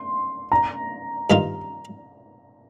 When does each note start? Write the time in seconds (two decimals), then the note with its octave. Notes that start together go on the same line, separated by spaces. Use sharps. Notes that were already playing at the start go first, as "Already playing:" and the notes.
Already playing: C6
0.52 A#5
1.30 G2 D#3 A#3 F4